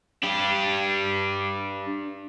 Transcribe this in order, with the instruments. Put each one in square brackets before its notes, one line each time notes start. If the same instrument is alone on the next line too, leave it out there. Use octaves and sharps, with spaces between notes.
[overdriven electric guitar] D4 G4